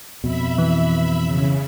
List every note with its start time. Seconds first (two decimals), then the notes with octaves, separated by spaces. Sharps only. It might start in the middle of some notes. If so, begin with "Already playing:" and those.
0.24 F2 B2 E5 B5
0.58 E3
1.25 C#3